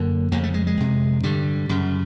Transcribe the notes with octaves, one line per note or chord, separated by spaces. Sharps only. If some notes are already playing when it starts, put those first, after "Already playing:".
Already playing: F#2 D3 A#3
F2 C#3 A#3
A3
G#3
G#3
F2 C3
G2 D3 G3
F#2 C#3